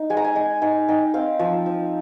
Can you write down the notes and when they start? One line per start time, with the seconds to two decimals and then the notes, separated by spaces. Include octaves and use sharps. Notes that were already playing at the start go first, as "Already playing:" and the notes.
Already playing: D#4
0.10 G#3 G#5
0.17 A#5
0.24 G#5
0.36 D#4 G#5
0.62 D#4 G#5
0.88 D#4 G5
1.14 C4 F5
1.39 F3
1.66 F3